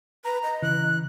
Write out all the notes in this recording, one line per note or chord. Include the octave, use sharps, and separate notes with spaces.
B4 A#5
D#5
C#3 E3 F#6